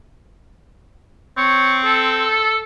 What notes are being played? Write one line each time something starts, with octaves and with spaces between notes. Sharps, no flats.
C4 C#5
A4